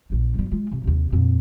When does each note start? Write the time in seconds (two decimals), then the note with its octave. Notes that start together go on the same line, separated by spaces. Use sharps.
0.10 A#1 D#2
0.35 G1 G3
0.51 G#3 F4
0.72 C3
0.84 D#2 C3
1.12 F2 A#2